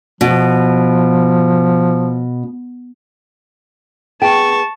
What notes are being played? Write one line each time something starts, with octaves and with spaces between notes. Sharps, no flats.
B2 F3
B3 G#4 G5 A5 C#6